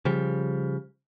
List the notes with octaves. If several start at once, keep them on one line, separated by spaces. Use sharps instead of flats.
C#3 F3 G3